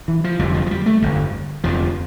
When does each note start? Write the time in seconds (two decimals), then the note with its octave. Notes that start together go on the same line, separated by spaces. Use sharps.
0.08 E3
0.24 F3
0.39 F1 F2 D3 G3
0.54 F3
0.66 F3
0.71 G3
0.86 A3
1.02 G1 F2 D3
1.64 F1 F2 D3 F3